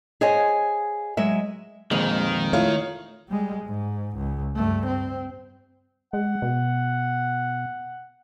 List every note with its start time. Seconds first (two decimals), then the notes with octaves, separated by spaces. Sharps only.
0.21 G#4 C5 C#5 D#5 F5 G#5
1.17 F#3 G#3 E5
1.91 F2 A#2 D#3 G#3
2.53 A3 E4 F4 C#5 F5
3.28 G3 G#3
3.66 G#2
4.18 C#2
4.55 G2 A3
4.87 C4
6.13 G#3 F#5
6.42 B2